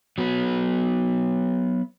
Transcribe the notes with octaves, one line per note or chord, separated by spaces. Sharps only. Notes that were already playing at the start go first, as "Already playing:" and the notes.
F#3 B3 B4